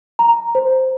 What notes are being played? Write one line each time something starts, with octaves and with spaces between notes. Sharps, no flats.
A#5
C5